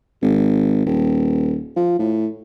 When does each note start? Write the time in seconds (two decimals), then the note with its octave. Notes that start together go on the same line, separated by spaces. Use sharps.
0.22 G#1
0.86 D#1
1.76 F3
1.99 A2